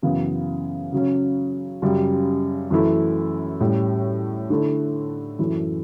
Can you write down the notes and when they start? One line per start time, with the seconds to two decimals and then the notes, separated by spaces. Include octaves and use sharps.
0.02 F#2 C#3 E3 B3
0.93 C#3 F#3 C#4
1.82 F#2 C#3 G3
2.70 F#2 E3 A3 E4
3.61 A2 G3 C#4
4.50 D3 A3 E4
5.39 F#2 E3 A3 E4